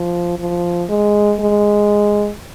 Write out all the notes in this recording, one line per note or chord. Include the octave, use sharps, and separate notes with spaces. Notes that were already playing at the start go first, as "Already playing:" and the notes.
Already playing: F3
F3
G#3
G#3